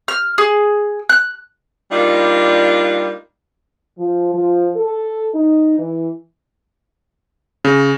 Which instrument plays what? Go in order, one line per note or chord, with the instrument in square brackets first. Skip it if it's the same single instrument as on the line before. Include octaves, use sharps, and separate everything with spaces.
[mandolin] F6
G#4
F#6
[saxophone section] G3 A#3 D4 D#4 F4
[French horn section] F3
F3
A4
D#4
E3
[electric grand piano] C#3